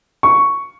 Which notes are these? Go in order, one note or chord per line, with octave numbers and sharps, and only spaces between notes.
C#6